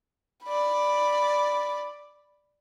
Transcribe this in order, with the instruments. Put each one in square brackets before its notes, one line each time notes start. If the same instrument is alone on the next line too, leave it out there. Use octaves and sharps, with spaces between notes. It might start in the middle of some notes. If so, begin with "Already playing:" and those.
[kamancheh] D5 B5